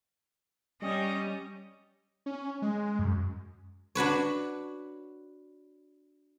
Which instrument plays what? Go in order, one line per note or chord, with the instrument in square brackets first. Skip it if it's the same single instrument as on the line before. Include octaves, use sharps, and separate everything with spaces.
[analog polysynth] G3 [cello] C#4 [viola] D#5
[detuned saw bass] C#4
G#3
F#2
[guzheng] D4 F#4 B4 C#5